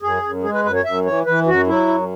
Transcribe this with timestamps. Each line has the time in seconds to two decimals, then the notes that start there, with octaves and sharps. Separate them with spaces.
0.02 F#2 G#4
0.23 F#2
0.43 G#3 G#4
0.53 B4
0.64 F#2 B4
0.74 C#5
0.84 F#2 E5
1.05 E3 C#5
1.25 E3 B4
1.46 F#2 F#4
1.67 F#3 E4
1.88 F#2